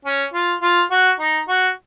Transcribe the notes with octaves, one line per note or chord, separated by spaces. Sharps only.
C#4
F4
F4
F#4
D#4
F#4